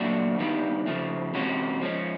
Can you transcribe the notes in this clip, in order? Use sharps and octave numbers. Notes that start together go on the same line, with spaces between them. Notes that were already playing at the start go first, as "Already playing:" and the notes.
Already playing: A#2 F#3 A3 D4 F#4
G2 D#3 G3 B3
C#3 F3 A3
C3 E3 G#3 C#4 F#4
F3 G#3 C#4